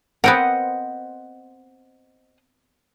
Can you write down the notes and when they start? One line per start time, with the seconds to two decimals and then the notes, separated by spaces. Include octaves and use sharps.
0.24 B3 C4 A#4 C5 D#5 F#5